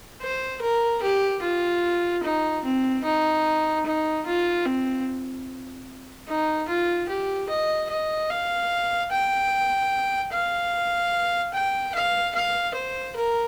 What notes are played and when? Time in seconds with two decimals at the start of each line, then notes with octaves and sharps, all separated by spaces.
0.21 C5
0.62 A#4
1.02 G4
1.42 F4
2.24 D#4
2.64 C4
3.05 D#4
3.86 D#4
4.26 F4
4.66 C4
6.28 D#4
6.68 F4
7.09 G4
7.49 D#5
7.90 D#5
8.30 F5
9.11 G5
10.32 F5
11.54 G5
11.95 F5
12.35 F5
12.75 C5
13.16 A#4